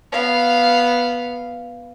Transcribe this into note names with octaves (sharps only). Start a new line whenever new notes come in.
B3 F5